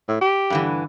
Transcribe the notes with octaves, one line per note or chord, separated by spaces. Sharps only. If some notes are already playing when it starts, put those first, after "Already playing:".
A2
G4
G2 D3 E3